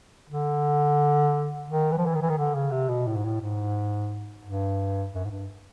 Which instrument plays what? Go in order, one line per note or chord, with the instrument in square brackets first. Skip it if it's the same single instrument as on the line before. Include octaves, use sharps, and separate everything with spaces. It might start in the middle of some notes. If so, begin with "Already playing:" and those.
[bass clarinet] D3
D#3
E3
F3
E3
D#3
E3
D#3
D3
C#3
C3
B2
A2
G#2
A2
G#2
G2
F#2
G#2
G2